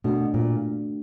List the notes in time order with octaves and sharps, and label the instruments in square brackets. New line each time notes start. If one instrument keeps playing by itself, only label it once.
[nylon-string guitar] B2 [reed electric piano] A3 D4 F#4
[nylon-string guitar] A#2